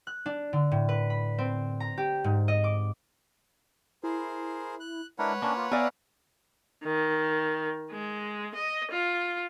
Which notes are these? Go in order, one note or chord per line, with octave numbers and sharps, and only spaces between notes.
F#6
D4
D3
A2
B4
B5
C4
A#5
G4
G#2
D#5
D6
E4 G#4 A#4 C5
F#6
G#3 D4 E4 A#4 B4 C#5 F#5
A#3 C#4 D4 D6
F4
B3 D5 E5 F5 G#5 A#5
D#3
G#3
D#5
F4